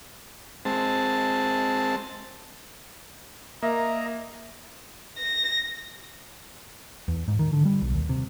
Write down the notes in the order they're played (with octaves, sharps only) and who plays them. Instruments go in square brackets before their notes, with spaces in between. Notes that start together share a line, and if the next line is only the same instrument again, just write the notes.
[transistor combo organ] G#3 C4 A5
[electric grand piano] A#3 [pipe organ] A#4 D#5 A#5 [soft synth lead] E5
[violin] A#6
[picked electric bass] E2
G#2
D#3
D3
G3
B1
D#2
C3